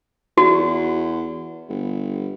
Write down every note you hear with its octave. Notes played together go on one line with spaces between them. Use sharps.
E2 F#4
G1